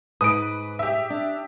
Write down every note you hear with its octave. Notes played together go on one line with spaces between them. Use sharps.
G#2 B4 D#6 D7
G4 E5
D4